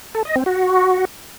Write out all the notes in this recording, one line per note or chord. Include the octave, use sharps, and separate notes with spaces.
A4
D#5
C4
F#4